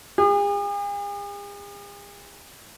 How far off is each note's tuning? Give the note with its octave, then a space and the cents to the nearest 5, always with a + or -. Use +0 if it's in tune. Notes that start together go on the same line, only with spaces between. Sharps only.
G#4 -45